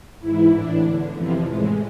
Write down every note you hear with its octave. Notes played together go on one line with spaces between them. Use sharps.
G#2 E3 E4
A2 E3 D4
E2 D3
F2 C3 E3 F3
A2 E3 G#3